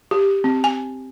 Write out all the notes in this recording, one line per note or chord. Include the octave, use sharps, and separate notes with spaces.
G4
C4
G#5